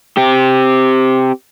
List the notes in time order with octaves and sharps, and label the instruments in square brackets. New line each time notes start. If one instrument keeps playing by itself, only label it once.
[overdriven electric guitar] C4 G4